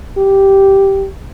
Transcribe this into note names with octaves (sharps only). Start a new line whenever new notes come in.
G4